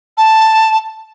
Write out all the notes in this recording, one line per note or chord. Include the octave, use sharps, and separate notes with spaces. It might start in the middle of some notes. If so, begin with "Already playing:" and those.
A5